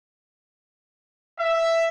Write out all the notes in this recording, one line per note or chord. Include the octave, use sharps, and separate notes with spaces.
E5